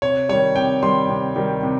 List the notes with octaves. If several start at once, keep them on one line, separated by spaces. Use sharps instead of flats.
C3 C#5
D#3 G3 C#5
C3 G5
D#3 G3 C6
C3
D#3 G3
C3